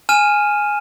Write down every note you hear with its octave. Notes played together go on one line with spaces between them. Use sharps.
G#5 F6 D#7 E7